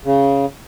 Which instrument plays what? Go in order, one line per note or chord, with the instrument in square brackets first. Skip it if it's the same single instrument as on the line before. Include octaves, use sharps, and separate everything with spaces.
[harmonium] C#3